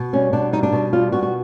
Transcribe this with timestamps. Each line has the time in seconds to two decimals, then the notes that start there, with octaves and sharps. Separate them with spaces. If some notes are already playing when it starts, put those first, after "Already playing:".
Already playing: B2
0.13 G3 C#4
0.33 B2 D4
0.53 G3 D#4
0.63 D4
0.72 B2
0.93 G3 F4
1.12 B2 F#4
1.22 F#4